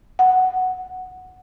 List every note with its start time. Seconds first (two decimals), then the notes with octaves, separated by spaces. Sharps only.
0.19 F#5